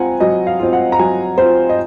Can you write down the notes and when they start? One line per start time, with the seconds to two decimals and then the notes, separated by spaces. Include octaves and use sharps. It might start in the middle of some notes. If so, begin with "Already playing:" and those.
Already playing: C4 F4 F#5 G#5 A#5
0.20 F#3 D#5
0.47 F5
0.59 C4 F4
0.73 F#5
0.92 A#5
0.99 F#3 G#5
1.38 C4 F4 C5
1.69 D#5